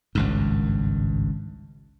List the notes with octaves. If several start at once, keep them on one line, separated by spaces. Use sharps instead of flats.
G#1 C#2 G2